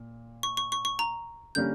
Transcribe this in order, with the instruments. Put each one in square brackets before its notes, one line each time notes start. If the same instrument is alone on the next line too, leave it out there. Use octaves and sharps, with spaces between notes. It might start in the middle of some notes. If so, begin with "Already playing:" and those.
Already playing: [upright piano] A#2
[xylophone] C#6
C#6
C#6
C#6
A#5
[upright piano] D3 G3 A#3 C#4 [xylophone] G6